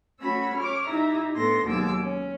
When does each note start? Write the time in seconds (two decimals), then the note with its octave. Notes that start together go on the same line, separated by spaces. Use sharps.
0.20 G3 A3 C#4 F#4 B5 E6
0.58 C#5 D6 F6
0.87 D#4 E4 G4 E5 A#5
1.34 A2 B3 D4 A4 C6 A#6
1.64 D#2 B2 F#3 G#3 D6 E6
2.00 C#4